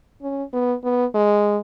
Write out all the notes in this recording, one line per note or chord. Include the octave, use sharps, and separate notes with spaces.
C#4
B3
B3
G#3